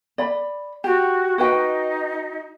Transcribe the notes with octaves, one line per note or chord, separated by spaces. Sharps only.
D5 B5
F#4 G4
D#4 F#4 B4 G5